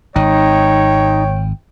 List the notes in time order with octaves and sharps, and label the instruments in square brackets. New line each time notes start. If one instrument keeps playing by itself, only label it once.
[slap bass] G#1 [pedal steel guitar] D#4 [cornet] C#5 [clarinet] G5